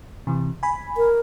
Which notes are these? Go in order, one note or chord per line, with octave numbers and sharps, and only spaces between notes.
C3 E3
G#5 B5
A#4